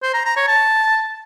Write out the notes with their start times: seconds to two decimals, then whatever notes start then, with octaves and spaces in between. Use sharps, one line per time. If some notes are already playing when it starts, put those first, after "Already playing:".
0.02 C5
0.13 A#5
0.25 A#5
0.36 C#5
0.48 A5